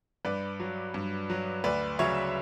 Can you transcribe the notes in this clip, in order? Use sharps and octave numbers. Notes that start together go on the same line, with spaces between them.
G2 B4 D5
F#3
G2
F#3
D2 B4 D5
C#3 F#3 C#5 E5